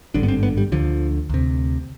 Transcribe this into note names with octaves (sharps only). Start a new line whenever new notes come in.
G#1 G2 D3 D4
B3
C4
B3
G3
D2 D3 F3
D2 C3